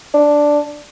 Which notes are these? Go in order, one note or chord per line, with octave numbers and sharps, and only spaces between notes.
D4